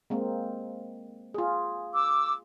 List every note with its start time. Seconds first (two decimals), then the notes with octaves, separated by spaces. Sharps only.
0.10 G#3 A#3 C4
1.34 F4 G#4
1.94 D6 E6